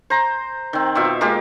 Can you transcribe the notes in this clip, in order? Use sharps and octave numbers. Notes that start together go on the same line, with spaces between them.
C5 A#5
D#3 C4
B2 F4 E5
G#3 A#3 F4 G4